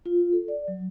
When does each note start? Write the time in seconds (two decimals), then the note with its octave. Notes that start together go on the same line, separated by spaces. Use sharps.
0.06 F4
0.33 A4
0.48 D5
0.68 F#3